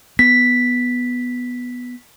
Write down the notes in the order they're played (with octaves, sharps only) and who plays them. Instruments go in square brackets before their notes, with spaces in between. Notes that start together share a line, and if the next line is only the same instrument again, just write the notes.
[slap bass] B3 [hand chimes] B6